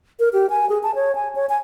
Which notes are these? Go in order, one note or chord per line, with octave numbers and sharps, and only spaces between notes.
A#4
G4
G#5
G#4
A5
C#5
G#5
C#5
G#5